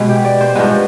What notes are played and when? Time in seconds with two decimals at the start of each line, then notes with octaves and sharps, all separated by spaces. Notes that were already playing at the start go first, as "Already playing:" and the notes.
Already playing: B2 G#3 B3
0.09 G4
0.25 D5
0.41 C5
0.55 G2 F3 G#3 B3 B4